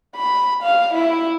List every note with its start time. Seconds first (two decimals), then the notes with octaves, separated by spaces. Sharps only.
0.16 B5
0.63 F5
0.94 E4